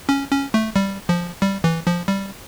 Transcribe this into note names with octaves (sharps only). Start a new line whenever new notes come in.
C#4
C#4
A3
G3
F3
G3
E3
F3
G3